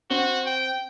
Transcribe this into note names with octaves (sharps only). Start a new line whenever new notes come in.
C4 F#4 G7
G5